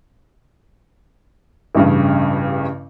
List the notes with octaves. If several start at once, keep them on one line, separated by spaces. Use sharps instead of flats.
A1 G2 C#3